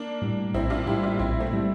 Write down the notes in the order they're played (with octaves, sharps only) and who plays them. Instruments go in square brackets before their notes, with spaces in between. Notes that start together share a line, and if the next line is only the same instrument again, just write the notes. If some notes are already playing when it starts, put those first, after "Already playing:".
Already playing: [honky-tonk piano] A#3 D4
[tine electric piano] A2 G3
[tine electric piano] A#1 [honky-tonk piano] C4 E4
[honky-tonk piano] D4 F4
[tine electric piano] A2 G3 [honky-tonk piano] E4 G4
[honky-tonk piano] D4 F4
[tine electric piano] A#1 [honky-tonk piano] C4 E4
[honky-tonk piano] A3 C4
[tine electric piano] A2 G3